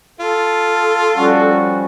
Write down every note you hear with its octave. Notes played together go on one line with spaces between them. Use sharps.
F4 A4
F3 G3 C#4 F#4